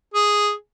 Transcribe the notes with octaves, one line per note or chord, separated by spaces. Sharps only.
G#4